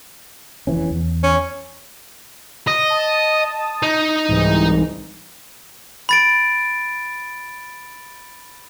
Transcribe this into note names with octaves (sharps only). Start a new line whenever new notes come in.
F1 E3 C#4
E2
C#4
D#5
A5 D#6
D#4
C2 G#2 E3
B5 A6 D7